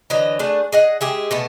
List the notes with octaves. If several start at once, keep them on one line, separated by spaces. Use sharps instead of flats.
D3 E3 F#3 D#5
A3 D4 G#4 F#5
G#4 D#5 F#5
G#3 G4 G#4 E5
B2 A3 B3